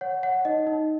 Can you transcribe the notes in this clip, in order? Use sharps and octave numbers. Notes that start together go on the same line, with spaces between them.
C#5 F#5
C#5 F#5
D#4 D#5
D#4